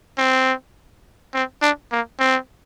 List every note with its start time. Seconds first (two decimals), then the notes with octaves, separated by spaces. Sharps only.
0.18 C4
1.34 C4
1.62 D4
1.92 A#3
2.19 C4